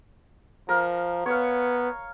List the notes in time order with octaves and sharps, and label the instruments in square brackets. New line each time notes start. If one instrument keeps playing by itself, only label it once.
[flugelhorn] F3 [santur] A#4
[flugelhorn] B3 [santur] C#5 F5